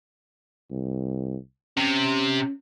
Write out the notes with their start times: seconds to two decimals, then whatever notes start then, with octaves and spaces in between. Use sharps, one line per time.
0.71 C2
1.77 C3 C#4